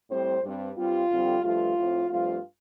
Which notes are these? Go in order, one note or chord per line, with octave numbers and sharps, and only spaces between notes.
A2 G3 C4 C5
G2 G3 C4
G2 G3 C4 F4
F2 D3 G3 C4
G2 F3 A3 F4
A2 F3 C4
G2 F3 A3 C4 F4